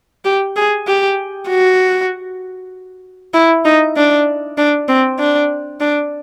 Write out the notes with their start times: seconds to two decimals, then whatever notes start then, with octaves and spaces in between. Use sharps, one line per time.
0.25 G4
0.56 G#4
0.87 G4
1.48 F#4
3.34 E4
3.65 D#4
3.96 D4
4.58 D4
4.88 C4
5.19 D4
5.80 D4